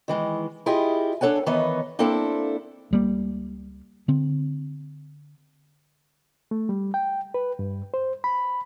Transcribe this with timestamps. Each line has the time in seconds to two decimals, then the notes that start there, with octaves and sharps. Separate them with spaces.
0.08 D#3 E3 G#3
0.66 E4 F4 G4 G#4 D#5
1.21 D4 A4 C#5 F#5 G#5
1.46 D#3 E3 B3 B4 C#5 D#5
1.99 A#3 C4 D4 E4 A4
2.91 C#2 G3 A#3
4.08 D3 C4
6.51 A3
6.69 G3
6.94 G5
7.34 B4
7.59 G2
7.94 C5
8.24 B5